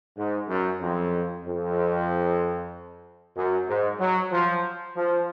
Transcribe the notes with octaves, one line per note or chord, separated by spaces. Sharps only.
G#2
F#2
F2
F2
F#2
G#2
F#3
F3
F3